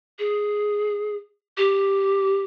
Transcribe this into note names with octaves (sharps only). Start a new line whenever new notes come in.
G#4
G4